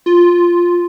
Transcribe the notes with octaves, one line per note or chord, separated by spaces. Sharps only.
F4